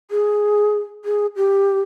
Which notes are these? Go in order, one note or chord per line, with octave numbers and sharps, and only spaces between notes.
G#4
G#4
G4